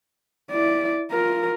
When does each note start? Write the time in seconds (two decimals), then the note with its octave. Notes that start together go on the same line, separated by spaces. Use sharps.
0.51 E4 D5
1.11 F4 A#4